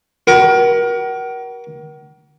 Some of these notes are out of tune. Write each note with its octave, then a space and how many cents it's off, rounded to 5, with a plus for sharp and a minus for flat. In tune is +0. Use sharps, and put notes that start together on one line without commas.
F#4 +40 A#4 +30